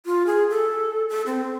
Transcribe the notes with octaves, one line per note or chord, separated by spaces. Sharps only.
F4
G#4
A4
A4
C4